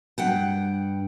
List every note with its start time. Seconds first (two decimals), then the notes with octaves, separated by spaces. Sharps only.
0.18 G2 F#5 G5